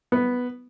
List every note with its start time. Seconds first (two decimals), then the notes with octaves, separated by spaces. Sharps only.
0.12 B3